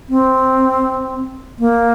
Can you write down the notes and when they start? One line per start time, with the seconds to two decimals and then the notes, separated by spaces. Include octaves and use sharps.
0.09 C4
1.59 A#3